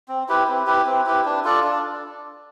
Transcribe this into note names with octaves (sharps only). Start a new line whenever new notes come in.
C4
E4 G4 B4
C4
E4 G4 B4
C4
E4 G4 B4
D4
F4 A4 D5
D4